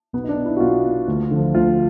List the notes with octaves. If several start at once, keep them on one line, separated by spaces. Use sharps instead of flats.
B1 B3
D#4
D4
B2
E4
F#4
B1 F4
B2
D2
D3 F3
D2 F4